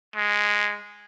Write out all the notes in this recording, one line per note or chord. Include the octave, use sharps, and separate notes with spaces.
G#3